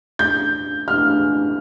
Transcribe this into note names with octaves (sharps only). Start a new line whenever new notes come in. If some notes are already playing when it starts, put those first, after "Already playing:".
G6
F6